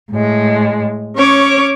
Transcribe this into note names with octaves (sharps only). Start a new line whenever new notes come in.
A2 G#3
C#4 C#5 D6